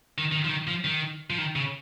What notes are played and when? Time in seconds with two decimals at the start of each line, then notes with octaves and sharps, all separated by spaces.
0.18 D#3
0.32 D#3
0.45 F3
0.49 D#3
0.67 F3
0.84 D#3
1.30 F3
1.38 D#3
1.56 C#3